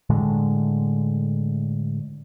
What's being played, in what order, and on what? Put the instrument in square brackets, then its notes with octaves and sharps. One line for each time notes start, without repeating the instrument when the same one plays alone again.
[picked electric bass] A2 D3 G#3